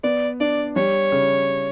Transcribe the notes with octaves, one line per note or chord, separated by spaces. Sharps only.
B3 D5
D4 D5
G3 C#5
C#3